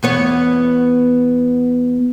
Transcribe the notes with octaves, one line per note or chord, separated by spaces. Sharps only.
E2 B3 C#5